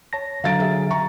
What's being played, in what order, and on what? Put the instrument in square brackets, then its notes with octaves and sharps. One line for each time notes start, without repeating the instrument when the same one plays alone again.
[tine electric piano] C#5 A5 A#6
[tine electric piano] D3 F#3 A#5 [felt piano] F5 A6 D7
[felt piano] G#4 E5
A#5 C#6